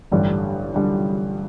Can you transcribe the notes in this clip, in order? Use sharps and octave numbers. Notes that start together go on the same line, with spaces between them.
A1 G2 D3 G3
D3 G3